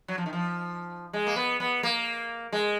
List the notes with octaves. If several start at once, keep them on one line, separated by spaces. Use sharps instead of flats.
F#3
F3
D#3
F3
G#3
A#3
B3
B3
A#3
G#3